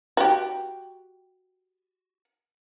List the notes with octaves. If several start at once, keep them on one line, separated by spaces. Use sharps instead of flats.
F#4 G4